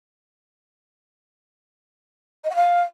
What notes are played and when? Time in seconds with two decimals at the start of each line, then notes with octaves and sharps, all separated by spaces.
2.44 D#5
2.50 F#5
2.55 F5